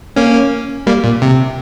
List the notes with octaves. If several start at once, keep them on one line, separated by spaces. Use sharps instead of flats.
A#3 C#4
G3 A#3
A#2
C3